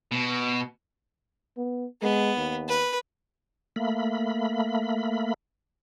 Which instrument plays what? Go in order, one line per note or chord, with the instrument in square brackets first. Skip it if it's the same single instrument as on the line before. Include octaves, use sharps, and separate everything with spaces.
[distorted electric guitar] B2
[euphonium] B3
[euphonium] G#3 [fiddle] B3
[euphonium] D#2
[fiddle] B4
[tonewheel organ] A3 A#3 B5